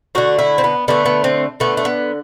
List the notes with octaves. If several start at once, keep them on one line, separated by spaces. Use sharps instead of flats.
D3 A3 F#4
E4
C4
B3
D3 A3 B3
B3
C4
D3 A3 B3
A3
B3